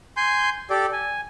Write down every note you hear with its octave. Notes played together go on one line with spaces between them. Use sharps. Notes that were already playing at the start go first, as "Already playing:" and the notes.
G#5 C6 G6
G4 A4 D5
G#5